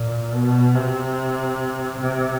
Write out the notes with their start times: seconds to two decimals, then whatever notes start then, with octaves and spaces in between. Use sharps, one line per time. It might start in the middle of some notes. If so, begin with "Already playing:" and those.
Already playing: A#2
0.33 B2
0.75 C3
2.00 C3